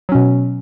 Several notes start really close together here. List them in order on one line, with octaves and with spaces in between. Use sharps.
F#3 C#4 B2